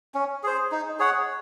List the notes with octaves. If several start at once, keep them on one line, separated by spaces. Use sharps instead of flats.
C#4
G#4 C5
D#4
G#4 C#5 F#5